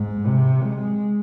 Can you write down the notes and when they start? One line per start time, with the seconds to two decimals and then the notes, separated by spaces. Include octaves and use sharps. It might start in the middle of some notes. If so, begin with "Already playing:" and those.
Already playing: G#2
0.26 C3
0.63 G#3